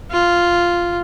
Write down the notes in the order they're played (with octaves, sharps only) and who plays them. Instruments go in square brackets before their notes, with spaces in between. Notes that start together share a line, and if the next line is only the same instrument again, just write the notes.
[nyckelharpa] F4